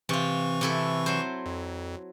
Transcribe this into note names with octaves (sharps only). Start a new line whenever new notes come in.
C3 E3 F4 C#6
C3 E4 A4
F#3 C5
F2